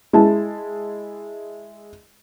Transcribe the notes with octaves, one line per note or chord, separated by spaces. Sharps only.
G#3 E4 A5